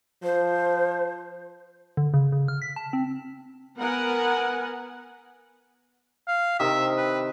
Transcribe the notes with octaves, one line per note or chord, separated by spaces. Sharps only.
F3 C5
D3
C#3
C#3
F6
B6
A5
C4
B3 A#4 F#5 G#5
F5
C3 D#3 D#5 E5
B4